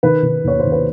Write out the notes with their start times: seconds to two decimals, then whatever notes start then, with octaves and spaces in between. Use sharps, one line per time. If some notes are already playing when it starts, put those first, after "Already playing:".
0.03 D#3 B4
0.23 D#3
0.44 D#2 C#5
0.60 D#2 C5
0.72 B4